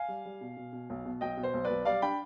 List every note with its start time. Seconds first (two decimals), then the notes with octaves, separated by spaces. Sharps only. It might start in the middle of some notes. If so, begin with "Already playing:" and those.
Already playing: F5 G#5
0.08 G3
0.25 G3
0.41 B2
0.57 B2
0.73 B2
0.90 B1
1.05 B2
1.21 B1 D#5 G5
1.37 B2
1.43 C5
1.54 B1
1.65 B4 D5
1.70 B1
1.85 G3 D5 F5
2.02 D4 G5 B5